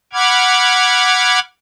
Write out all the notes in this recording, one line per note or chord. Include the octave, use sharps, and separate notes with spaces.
F#5 B5 D6 F6 G#6